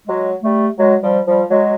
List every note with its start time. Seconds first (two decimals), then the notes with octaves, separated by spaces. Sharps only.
0.08 F#3 G#3
0.43 G3 A3
0.78 F#3 G#3
1.02 F3 G3
1.26 F3 G3
1.50 F#3 G#3